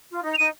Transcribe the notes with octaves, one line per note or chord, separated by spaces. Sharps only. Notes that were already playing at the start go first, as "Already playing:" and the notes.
F4
D#4
F7
D#4 D#7